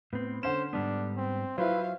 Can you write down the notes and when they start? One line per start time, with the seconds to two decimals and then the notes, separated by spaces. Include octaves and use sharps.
0.13 A2 B3 C4
0.43 D3 C#4 C5 F#5 E7
0.73 G#2 G3 B3 D4
1.17 C4
1.58 F#3 E4 F4 B4 C5 F5